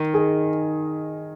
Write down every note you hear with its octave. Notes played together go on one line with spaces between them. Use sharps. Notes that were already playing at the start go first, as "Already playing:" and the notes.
Already playing: D#3 A#4
G#4